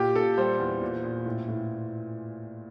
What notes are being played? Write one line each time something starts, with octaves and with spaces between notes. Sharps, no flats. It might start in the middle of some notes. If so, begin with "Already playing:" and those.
Already playing: A#2 G4
A#2 A4
G3 C5
E2
A#2
A#2
A2
A2